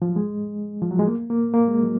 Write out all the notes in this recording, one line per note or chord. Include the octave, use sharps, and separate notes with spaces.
F3
F#3
G#3
F3
F#3
G#3
A#3
A#3
A#3
G#3
F#3